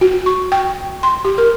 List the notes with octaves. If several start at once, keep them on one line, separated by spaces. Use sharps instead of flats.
F#4
C#6
G5
C6
G4
A#4